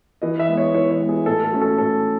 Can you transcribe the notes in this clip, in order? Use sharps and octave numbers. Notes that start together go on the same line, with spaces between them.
E3 D#5
E5
G#3 B3
C#5
E3 C#5
C#5
G#3 B3
G#4
A2 A4
A4
F#3 A3 C#4
A4
A2 A4